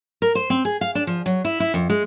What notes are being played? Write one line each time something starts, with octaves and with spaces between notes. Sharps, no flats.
A#4
C5
C4
G#4
F5
D4
F3
F#3
E4
E4
F2
G#3